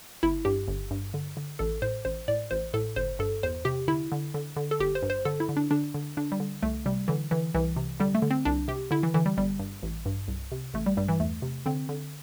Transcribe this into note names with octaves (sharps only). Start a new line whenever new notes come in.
G1 E4
G2 G4
G1
G2
D3
D3
A1 A4
A2 C5
A1 C5
A2 D5
A1 C5
A2 A4
G1 C5
G2 A4
E2 C5
C3 G4
D3 E4
D3
D3
D3
A4
G1 G4
C5
G2
C5
D3 A4
E4
D3
D4
D3 D4
D3
D3 D4
G3
D3
C2 A3
C3 G3
D3 E3
D3 E3
C2 E3
C3
D3 G3
A3
D3
C4
C2 D4
C3 G4
D3 E4
E3
D3 E3
G3
G1 G3
G2
A1
G2
C2
C3
A1 A3
G3
G2 G3
E3
E2 A3
C3
D3 C4
D3